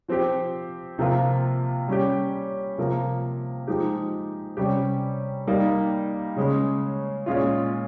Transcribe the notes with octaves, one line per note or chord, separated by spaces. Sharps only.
F3 C4 G4
C3 F3 A#3 F4
G3 C#4 G4
C3 F3 A#3
F3 G#3 D#4 G4
C3 G3 C#4 G4
G3 A#3 D#4
C#3 G#3 C#4
A#2 G#3 C#4 F4